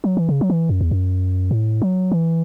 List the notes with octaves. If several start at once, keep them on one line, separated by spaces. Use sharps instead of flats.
F#3
E3
C#3
F#3
E3
F#2
E2
F#2
A2
F#3
E3